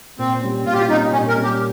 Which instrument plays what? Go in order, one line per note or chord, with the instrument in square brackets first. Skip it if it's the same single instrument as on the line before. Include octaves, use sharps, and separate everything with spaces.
[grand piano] A#2 [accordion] C4
[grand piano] G3 C#4
[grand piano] A#2 [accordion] F4
[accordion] G4
F4
[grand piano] G3 C#4 [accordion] D#4
[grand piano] A#2 [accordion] C#4
[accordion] A#4
[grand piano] G3 C#4
[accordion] G4